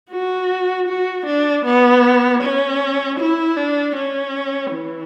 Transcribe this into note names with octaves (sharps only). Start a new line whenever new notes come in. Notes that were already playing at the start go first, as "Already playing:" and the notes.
F#4
F#4
D4
B3
C#4
E4
D4
C#4
E3